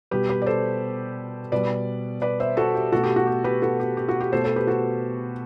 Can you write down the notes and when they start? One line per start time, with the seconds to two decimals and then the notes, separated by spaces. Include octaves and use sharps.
0.11 B2 G3 G4 B4
0.30 G4 B4
0.42 D5
0.46 A4 C5
1.52 B2 G3 B4 D5
2.22 B4 D5
2.40 C5 E5
2.57 F#4 A4
2.75 G4
2.92 B2 A3 F#4 A4
3.04 G4
3.16 F#4
3.27 G4
3.44 G4 B4
3.62 F#4 A4
3.80 G4
3.97 G4
4.09 F#4
4.21 G4
4.32 B2 A3 A4 C5
4.44 A4 C5
4.56 G4 B4
4.67 F#4 A4